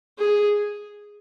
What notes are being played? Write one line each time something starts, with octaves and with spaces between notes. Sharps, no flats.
G#4